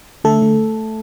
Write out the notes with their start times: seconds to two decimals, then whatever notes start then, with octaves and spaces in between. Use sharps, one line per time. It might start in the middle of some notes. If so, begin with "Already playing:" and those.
0.24 D3 A3 A4
0.42 D3